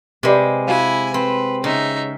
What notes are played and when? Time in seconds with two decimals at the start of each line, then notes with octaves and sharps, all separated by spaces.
0.23 C3 G#3 G4 B4 D5
0.68 E4 F#4 F5 G#5
1.14 C4 B4
1.64 C#3 D#4 E5